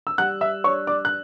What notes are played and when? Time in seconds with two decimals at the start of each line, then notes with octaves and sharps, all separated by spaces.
0.07 E6
0.18 G3 F#5 F#6
0.41 E5 E6
0.64 D4 C#5 C#6
0.87 D5 D6
1.05 F#6